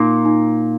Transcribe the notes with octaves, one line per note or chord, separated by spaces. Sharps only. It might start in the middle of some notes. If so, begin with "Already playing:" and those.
Already playing: A#2 A#3 D#4
D#4